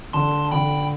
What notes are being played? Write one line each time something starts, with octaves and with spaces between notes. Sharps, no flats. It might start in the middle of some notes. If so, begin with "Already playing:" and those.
D3 A5 C6
D3 G5 B5